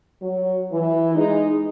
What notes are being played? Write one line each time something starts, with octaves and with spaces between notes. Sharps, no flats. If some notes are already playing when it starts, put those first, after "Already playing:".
F#3
E3
E3 G#3 D#4